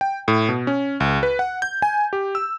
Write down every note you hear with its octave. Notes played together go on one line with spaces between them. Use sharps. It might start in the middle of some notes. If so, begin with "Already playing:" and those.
G5
A2
B2
C#4
C#2
B4
F#5
G6
G#5
G4
E6